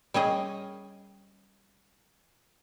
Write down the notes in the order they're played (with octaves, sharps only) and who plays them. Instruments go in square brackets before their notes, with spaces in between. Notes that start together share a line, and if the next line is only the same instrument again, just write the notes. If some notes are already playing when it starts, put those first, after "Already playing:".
[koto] G3 C#4 G#4 D#5